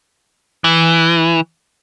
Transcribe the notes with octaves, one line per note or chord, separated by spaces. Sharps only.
E3